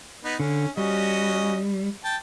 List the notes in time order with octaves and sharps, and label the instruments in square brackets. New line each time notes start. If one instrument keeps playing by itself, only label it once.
[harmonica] B3 D#4 B4
[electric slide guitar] D3 [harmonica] C#4
[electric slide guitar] G3 [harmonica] C#4 F#4 D#5
[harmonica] G5 A5